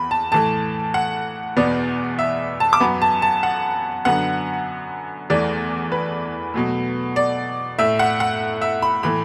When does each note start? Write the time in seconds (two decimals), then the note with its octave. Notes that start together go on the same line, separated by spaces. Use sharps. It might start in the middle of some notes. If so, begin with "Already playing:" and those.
Already playing: E2 B5
0.11 A5
0.32 A2 E3 A3 A5
0.94 F#5
1.57 E2 B2 B3 D5
2.19 E5
2.60 A5
2.73 D6
2.80 F#2 F#3 B3 B5
3.02 A5
3.22 A5
3.43 F#5
4.05 F#2 D3 F#3 B3 F#5
5.30 E2 E3 A3 D5
5.92 B4
6.54 B2 F#3 A3
7.16 D5
7.78 A2 A3 E5
7.99 F#5
8.20 F#5
8.62 E5
8.82 B5
9.03 A2 E3 A3 B5